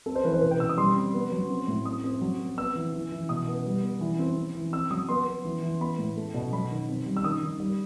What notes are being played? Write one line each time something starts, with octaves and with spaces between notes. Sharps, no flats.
C4 A4
C5
E3 B4
C5
B2 B4
G5
B2 E6
D#6
G3 C6
C4
B3
F#3
C4
A2
C4 D#6
C4
F#3
C4
B3 E6
E3
E3
E3
B2 D#6
B3
G3
B3
E3
C4
C4
E3
C4 E6
F#3 D#6
B3 C6
B3
E3
E3
B3 B5
A2
A3
B2
F#3 B5
D#3
C4
G3
E6
D#3 D#6
D#3
G3